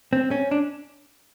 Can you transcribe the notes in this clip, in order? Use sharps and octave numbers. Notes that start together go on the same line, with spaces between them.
C4
C#4
D4